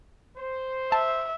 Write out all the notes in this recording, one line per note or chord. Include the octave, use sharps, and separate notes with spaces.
C5
E5 A5